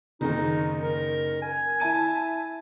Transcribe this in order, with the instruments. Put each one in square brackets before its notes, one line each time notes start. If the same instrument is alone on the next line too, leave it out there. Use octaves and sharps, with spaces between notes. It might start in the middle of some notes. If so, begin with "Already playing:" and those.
[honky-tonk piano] F#1 D#3 [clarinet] D#4
[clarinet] A#4
G#5
[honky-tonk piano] E4 A5 D#7